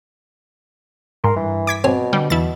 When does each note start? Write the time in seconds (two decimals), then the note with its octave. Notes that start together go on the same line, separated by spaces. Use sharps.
1.24 G#2 A#4 C6
1.36 G2 E3
1.67 D6 G#6 B6
1.84 B2 C4 C#5 G#5
2.13 D3 G3
2.30 E2 B2 E4 A6